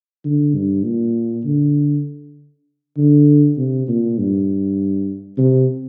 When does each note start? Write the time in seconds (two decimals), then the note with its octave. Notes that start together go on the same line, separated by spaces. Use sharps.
0.25 D3
0.54 G2
0.84 A#2
1.45 D3
2.97 D3
3.57 C3
3.88 A#2
4.18 G2
5.38 C3